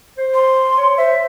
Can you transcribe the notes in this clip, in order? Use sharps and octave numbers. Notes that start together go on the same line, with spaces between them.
C5
C6
C#5
C5 E5